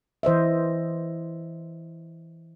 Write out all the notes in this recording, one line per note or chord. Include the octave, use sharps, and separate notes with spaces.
E3 C5 D#5 E5